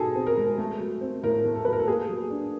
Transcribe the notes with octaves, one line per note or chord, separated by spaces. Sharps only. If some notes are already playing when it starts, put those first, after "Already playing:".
Already playing: B2 D#4 G#4 A4
C4
A#4
G#3
A3
F#3
C4
A2 A#4
A3
A4
F#3 B4
A#4
A4
A#3 G#4
F#3
D4